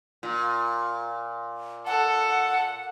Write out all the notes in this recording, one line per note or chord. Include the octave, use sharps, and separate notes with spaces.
A#2
A4 F#5